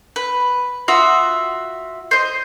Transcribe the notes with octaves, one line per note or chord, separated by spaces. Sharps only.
B4
F4 F#4 E5 D#6
C5 D#5